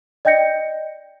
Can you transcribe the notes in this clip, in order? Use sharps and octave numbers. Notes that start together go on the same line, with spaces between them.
D5 D#5 G5 G6 A#6 C#7